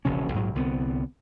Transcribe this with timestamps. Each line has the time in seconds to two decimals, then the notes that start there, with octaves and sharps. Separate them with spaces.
0.05 E1 A#1 C#3 C#4
0.34 A#1 G#2 F#3
0.55 C2 D3 B3 C4